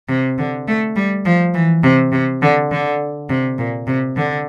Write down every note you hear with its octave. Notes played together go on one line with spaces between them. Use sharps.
C3
D3
A3
G3
F3
E3
C3
C3
D3
D3
C3
A#2
C3
D3